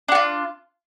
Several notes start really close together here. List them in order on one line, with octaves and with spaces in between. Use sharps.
D4 F#4 F4